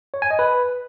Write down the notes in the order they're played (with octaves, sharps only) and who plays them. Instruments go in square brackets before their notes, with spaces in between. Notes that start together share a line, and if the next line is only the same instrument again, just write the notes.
[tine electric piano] C#5
G#5
D#5
B4